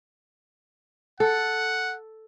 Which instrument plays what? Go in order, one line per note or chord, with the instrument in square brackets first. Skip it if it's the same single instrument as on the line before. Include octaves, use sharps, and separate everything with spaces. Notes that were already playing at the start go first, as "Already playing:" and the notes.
[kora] A4 [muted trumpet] F#5